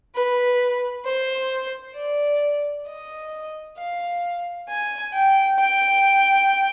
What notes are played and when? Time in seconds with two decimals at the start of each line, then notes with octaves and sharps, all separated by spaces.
0.15 B4
1.05 C5
1.96 D5
2.87 D#5
3.77 F5
4.68 G#5
5.14 G5
5.59 G5